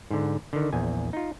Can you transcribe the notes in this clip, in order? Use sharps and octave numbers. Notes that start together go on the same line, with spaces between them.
G#2 D3
D3 D#3
A#1 E2 G#5
D#4 F4